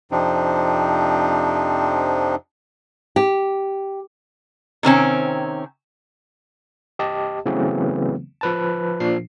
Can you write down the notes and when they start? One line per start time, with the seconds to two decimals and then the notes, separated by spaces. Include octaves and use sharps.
0.11 F2 C3 F3 C4 D4 D#4
3.16 G4
4.83 C3 D#3 C4 C#4
6.99 G4 D#5 A5
7.46 C#3 E3 F#3 A3 B3 C4
8.41 F3 B4 A5
9.00 A#2 F3 D4 C7